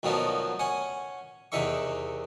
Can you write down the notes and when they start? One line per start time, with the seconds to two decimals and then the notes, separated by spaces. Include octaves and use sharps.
0.03 D2 B2 D#3 F3 F#3 B3
0.59 C#4 F#5 G#5
1.52 E2 C3 D#3 E5 C#6